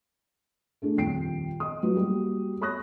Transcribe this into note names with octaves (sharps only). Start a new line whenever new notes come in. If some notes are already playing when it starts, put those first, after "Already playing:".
A3 D4 G#4
D#1 F2 G5 C7 D7
D#5 D#6
F#3 F#4 B4
G3 A#3 F#4
C#5 B5 C#6 D#6 F#6 A#6